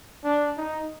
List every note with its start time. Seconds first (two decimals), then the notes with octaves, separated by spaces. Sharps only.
0.24 D4
0.57 D#4